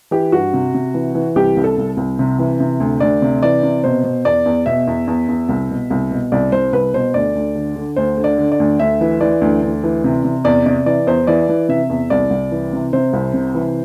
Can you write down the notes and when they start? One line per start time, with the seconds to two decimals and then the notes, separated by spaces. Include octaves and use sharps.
0.11 E3 G4
0.32 G2 F#4
0.53 C3
0.74 C3
0.94 E3
1.15 E3
1.36 C2 G4
1.57 C2
1.64 A4
1.78 C2
1.97 C2
2.19 C3
2.39 E3
2.60 C3
2.80 D2
3.00 D2 D5
3.22 C3
3.43 E3 D5
3.63 C3
3.84 B2 C5
4.04 B2
4.24 E2 D5
4.46 E2
4.66 B2 E5
4.87 E2
5.07 E2
5.29 E2
5.49 C2
5.70 B2
5.90 C2
6.11 B2
6.32 C2 D5
6.52 C2 C5
6.73 C2 B4
6.94 B2 C5
7.14 D2 D5
7.35 D2
7.55 D3
7.76 D3
7.96 D2 C5
8.17 D3
8.24 D5
8.38 D3
8.52 D5
8.60 D2
8.80 D2 E5
9.01 E3
9.21 E3 D5
9.41 D2
9.62 D2
9.83 E3
10.04 C3
10.24 C3
10.44 E2 D5
10.66 C3 D5
10.86 E3 D5
11.07 E2 C5
11.27 E3 D5
11.49 E3
11.69 C3 E5
11.89 E2
12.10 C2 D5
12.30 C2
12.51 E3
12.73 C3
12.93 C3 C5
13.13 C2
13.34 C3
13.54 E3